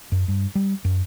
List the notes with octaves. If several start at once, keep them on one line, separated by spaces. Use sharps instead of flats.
F#2
G2
G3
F#2